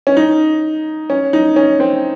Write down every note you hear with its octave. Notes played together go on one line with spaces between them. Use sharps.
C#4
D#4
C#4
D#4
C#4
C4